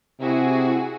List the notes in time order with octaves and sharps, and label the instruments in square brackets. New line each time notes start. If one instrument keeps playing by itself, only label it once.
[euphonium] C3 [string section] E4 F#4 G#4